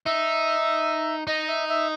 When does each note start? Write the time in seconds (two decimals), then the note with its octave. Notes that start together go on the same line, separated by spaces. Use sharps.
0.05 D#4 E5
1.27 D#4 D#5
1.48 E5
1.68 E5